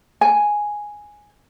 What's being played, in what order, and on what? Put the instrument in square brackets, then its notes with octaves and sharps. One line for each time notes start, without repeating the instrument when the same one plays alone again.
[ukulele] G#5